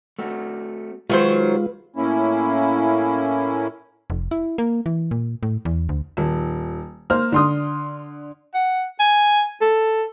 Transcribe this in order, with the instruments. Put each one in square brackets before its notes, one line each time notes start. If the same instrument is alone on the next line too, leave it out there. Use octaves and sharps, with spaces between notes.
[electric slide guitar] A3 C4 F#4
[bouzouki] D#3 F#3 C5 [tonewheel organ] G#3 F4 [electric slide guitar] B4
[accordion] A2 A#3 C#4 E4
[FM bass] F1
E4
A#3
E3
A#2
A2
E2
D2
[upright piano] D#1
A#3 C5 F6
D3 C6 D#6
[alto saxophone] F#5
G#5
A4